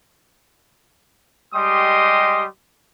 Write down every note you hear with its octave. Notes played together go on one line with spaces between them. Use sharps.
G3 G#3 G4 D#5 C6 D#6